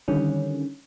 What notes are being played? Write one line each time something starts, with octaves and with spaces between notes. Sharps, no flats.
D3 D#3 G3 C#4